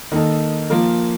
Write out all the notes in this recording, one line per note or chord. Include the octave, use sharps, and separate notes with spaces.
D#3 A#3 D#4 A4
F3 A#3 F4 A#4